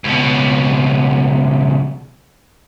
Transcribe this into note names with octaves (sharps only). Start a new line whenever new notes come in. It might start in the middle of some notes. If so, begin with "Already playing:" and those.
C#2 B2